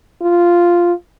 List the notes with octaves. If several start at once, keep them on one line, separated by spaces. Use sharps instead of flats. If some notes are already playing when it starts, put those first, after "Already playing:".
F4